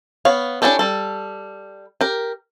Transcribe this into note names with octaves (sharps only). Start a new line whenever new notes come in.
B3 C#5 F5
C#4 D4 E4 G4 A4
G3 A4
G4 A#4